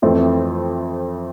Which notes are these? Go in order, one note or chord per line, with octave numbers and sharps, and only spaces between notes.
F2 E3 A3 C4